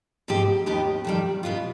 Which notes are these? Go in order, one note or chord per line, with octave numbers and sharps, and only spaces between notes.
G#2 F3 C4 G4
D#2 D#3 B3 D#4 G4
F2 D#3 G3
B2 B3 F4